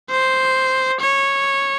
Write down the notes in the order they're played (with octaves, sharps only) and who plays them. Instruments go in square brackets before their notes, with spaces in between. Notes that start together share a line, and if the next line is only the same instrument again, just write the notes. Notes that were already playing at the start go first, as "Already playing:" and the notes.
[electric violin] C5
C#5